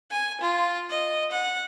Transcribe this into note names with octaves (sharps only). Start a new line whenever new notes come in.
G#5
F4
D#5
F#5